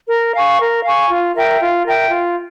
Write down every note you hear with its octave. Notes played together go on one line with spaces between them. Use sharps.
A#4
F5 G#5 C#6
A#4
F5 G#5 C#6
F4
A#4 E5 G5
F4
A#4 E5 G5
F4